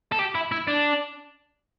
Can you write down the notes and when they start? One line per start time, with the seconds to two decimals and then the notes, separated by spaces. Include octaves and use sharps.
0.12 A4
0.19 G4
0.35 E4
0.52 E4
0.68 D4